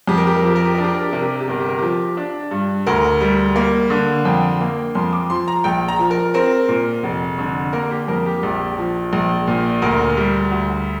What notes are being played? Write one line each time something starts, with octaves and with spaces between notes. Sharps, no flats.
F2 G4
A#4
G4
A#4
F3 G4
A#4
G4
D4 A#4
G4
A#4
G4
C3 A#4
G4
A#4
G4
G1 A#4
G4
A#4
F3 G4
D4
G2
D2 A#4
G3
A#3
D3
F2 G5
A#3
F2 C6
D6
F3 C6
A#5
A#1 G5
A#5
F3
A#4
C4 A#4
A#2
F1
D3
A#3 A#4
G4
F2 A#4
G4
A#1
F3
A#1
A#2
D2 A#4
G3
D2